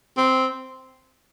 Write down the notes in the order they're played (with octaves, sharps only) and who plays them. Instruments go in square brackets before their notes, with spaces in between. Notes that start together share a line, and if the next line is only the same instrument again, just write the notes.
[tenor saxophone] C4